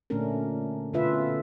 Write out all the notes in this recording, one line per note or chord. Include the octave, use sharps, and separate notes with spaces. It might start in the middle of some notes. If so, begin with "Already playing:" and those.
A#2 D3 A3 C#4 D4 A#4
B2 D3 C#4 F4 B4 E5